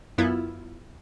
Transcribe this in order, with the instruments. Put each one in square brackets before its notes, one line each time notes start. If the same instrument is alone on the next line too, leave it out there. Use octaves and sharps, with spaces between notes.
[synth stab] F#2 B3 E4 F4